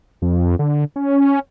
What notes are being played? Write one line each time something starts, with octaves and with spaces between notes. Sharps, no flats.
F2
D3
C#4